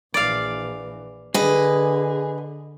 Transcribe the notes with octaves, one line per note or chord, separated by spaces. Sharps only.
A#1 E3 D5 F5
D3 G#4 B4 D#5